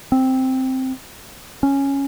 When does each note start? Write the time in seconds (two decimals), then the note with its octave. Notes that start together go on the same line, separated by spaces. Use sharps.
0.12 C4
1.63 C#4